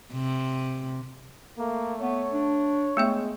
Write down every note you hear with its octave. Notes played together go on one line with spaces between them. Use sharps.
C3
A3 A#3
B3 C#5
D4
G#3 A3 B3 E5